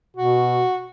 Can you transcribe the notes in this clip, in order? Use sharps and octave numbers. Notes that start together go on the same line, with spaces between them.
B2 F#4